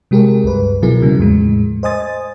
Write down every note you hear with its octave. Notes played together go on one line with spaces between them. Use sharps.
C3 G#3 G4 G#4 A#4
C#2 G2 B4
B2 F3 F#3 E4 G#4 A#4
C#3 F3 G3
E2 A2 G#3
C5 D#5 G#5 D#6 A6